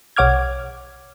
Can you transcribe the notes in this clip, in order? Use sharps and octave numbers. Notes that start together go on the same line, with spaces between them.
B1 C#5 F#5 D6 F6 G#6